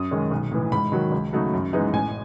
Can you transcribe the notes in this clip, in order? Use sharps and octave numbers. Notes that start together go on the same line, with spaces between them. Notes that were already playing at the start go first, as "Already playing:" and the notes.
Already playing: F#2 D#6
D#3 G#3 C#4
B1
A2 E3
G#2 B5
D#3 F#3
C#2
C#3 F#3 A3 D#4
F#2
E3 G#3 B3 D#4
A1 G#5